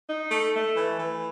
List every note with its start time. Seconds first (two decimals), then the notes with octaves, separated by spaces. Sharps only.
0.08 D#4
0.31 A3
0.54 A3
0.76 E3
0.99 E3